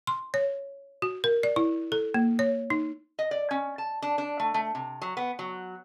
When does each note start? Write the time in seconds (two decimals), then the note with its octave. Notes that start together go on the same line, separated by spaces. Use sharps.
0.07 C6
0.34 C#5
1.02 F#4
1.24 A#4
1.43 D5
1.56 E4
1.92 A4
2.14 A#3
2.39 C#5
2.70 D#4
3.19 D#5
3.31 D5
3.51 C#4
3.78 A5
4.02 D4
4.18 D4
4.40 A3
4.54 A3
4.75 C3
5.02 F#3
5.17 B3
5.39 F#3